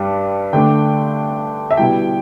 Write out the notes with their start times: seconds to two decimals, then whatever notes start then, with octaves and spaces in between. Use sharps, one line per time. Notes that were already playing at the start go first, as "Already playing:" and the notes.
Already playing: G2 G3 D4 A5
0.53 D3 A3 D4 G5
1.71 E5
1.77 B2 G3 E4 G5